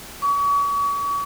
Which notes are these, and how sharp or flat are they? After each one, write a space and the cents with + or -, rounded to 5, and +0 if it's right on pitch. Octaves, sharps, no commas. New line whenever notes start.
C#6 +40